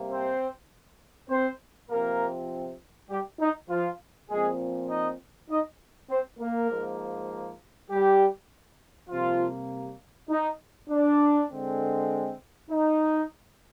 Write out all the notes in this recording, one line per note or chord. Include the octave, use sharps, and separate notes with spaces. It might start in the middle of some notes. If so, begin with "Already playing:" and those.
Already playing: C3 G3 A#3
C4 C5
C4 C5
C3 F3 A#3 C4 A#4
G3 G4
D#4
F3 F4
A#2 F3 G#3 C4 G#4
D#4 D#5
D#4 D#5
C4 C5
A#3 A#4
G#2 F3 A#3
G3 G4
C3 F3 G3 A#3 F4
D#4
D4
D3 G#3 C4
D#4